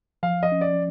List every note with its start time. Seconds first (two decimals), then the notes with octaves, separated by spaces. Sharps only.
0.23 F3 F5
0.43 D#5
0.52 C#4
0.61 D5